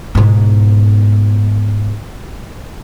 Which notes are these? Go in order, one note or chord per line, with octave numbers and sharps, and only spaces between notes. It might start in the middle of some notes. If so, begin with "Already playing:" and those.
G#2 B2